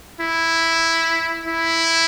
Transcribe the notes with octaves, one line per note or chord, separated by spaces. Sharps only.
E4
E4